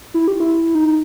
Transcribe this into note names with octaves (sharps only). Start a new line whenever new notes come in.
E4
G4
E4
D#4